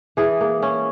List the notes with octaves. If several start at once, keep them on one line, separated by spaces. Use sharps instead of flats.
E3 G#4
A#3
C#4